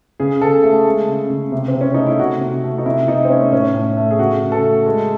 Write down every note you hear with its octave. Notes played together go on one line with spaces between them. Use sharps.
C#3 G#4
C#3 A4
A3 G#4
G#3
C#3
C#3
C3
C4
C3
C#4
A3 D#4
E4
C3 F#4
C3
A3
D#4
C3 E4
C3 D#4
C4
A3 C#4
A2 C#4
A2
A3
G#4
C#3 F#4
C#3
A4
A3
G#3